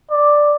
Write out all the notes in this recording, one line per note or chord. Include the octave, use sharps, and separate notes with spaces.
D5